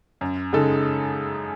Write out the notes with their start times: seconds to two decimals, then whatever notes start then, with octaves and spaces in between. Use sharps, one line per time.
0.21 F#2
0.53 C#3 G#3 D#4 A4